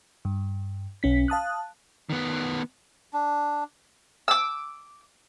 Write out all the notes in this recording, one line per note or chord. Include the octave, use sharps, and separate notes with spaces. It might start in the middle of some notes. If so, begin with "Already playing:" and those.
G2
B1 C#4 B6
F5 A5 D#6 F#6
D#3 B3
D4
D6 E6